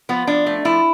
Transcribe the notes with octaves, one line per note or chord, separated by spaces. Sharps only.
F3 B3
F3 D4
A3
F3 E4